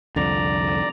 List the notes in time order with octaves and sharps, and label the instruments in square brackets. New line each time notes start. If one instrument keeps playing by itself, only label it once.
[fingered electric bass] C2 F2 D3 [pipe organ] D5 A#5